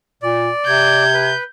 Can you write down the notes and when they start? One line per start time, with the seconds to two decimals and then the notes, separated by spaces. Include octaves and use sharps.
0.22 A#2 D5
0.67 C3 G6 G#6
1.14 B4